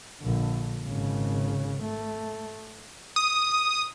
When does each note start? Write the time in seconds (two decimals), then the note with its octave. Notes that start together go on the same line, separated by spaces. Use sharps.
0.21 A#1 D3
0.85 G#1 C#3
1.82 A3
3.16 D#6